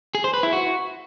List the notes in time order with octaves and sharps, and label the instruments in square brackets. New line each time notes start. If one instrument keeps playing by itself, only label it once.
[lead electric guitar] G#4
C5
B4
E4
F#4